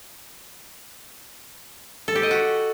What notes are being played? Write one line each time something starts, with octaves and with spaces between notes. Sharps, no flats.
A4
G4
D#5
F#4